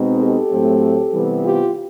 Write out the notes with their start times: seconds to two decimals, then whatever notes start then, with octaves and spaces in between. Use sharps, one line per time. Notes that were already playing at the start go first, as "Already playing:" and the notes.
Already playing: B2 G#3 C4 D#4
0.19 G4 A4
0.50 A2 F#3 A3 C4
1.13 C3 E3 G3 B3
1.43 F4 G4